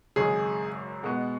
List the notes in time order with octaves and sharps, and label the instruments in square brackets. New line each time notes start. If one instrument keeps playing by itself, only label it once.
[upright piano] G#1 F#2 C#3 G#3 [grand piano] G#4
[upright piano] B2 G#3 B3 F#4